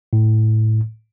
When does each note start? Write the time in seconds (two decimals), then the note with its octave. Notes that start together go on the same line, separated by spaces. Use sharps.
0.13 A2